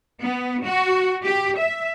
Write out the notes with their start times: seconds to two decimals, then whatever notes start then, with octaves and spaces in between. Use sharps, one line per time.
0.23 B3
0.66 F#4
1.24 G4
1.60 E5